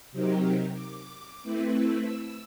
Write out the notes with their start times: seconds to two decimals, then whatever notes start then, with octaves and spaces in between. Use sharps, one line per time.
0.12 C3 F#3 C4 D#4 G4 A#4
0.73 D6
1.43 A3 C4 E4 B4
2.00 E6